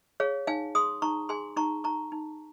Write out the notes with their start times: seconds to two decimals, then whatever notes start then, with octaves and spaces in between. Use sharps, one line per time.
0.20 G#4 C#5 F5
0.47 D#4 F5 G#5
0.75 G#4 C6 D#6
1.02 D#4 A#5 C#6
1.29 G#4 G#5 C6
1.57 D#4 A#5 C#6
1.84 D#4 A#5 C#6
2.12 D#4